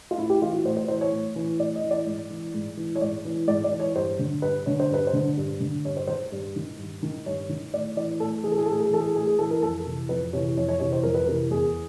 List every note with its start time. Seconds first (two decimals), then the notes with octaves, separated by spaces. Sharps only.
0.11 F4
0.17 A2 E4
0.30 G4
0.42 E3 F4
0.53 F#4
0.64 A2 C5
0.77 C5
0.88 E3 C5
1.01 C#5
1.13 A2
1.36 E3
1.59 A2 D5
1.76 D#5
1.84 E3
1.91 D5
2.06 G#2
2.30 E3
2.54 G#2
2.77 E3
2.95 C#5
3.01 G#2 D5
3.25 E3
3.48 G#2 D5
3.64 D5
3.71 E3
3.80 C#5
3.96 G2 C5
4.19 D3
4.42 G2 B4
4.66 D3 C#5
4.80 C5
4.90 G2 B4
5.07 C5
5.13 D3
5.37 G2
5.60 D3
5.85 G2 C#5
5.97 C5
6.07 D#3 C5
6.32 G2
6.56 D#3
6.78 G2
7.03 D#3
7.26 G2 C#5
7.49 D#3
7.73 A2 D5
7.97 E3 D5
8.20 A2 A4
8.44 E3 G#4
8.52 A4
8.58 G#4
8.66 A2 A4
8.73 G#4
8.80 A4
8.86 G#4
8.91 E3 A4
9.00 G#4
9.14 A2 G#4
9.27 G#4
9.38 E3 A4
9.51 A#4
9.62 F2 A4
9.85 C3 E3
10.09 F2 B4
10.33 C3 E3 C#5
10.57 F2 C#5
10.68 C#5
10.80 C3 E3 C#5
10.93 C5
11.03 F2 A#4
11.14 B4
11.26 C3 E3 A#4
11.51 E2 G#4